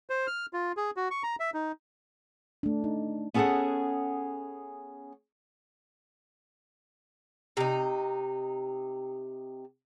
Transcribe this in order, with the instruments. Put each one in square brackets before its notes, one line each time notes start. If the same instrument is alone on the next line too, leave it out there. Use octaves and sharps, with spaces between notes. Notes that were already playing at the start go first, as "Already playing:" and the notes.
[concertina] C5
F6
F4
G#4
F#4
C#6
A#5
E5
D#4
[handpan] A3 D4
D#4
[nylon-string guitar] B3 C#4 G#4 A4 C#5 F#5
[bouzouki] C3 D#4